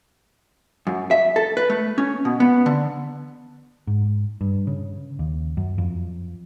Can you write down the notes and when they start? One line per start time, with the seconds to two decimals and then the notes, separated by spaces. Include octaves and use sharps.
0.87 F#2
1.11 E5
1.36 A4
1.57 B4
1.70 A3
1.98 C#4
2.25 B2
2.40 B3
2.66 D3
3.87 G#2
4.41 G2
4.67 C#3
5.19 D#2
5.57 F#2
5.78 F2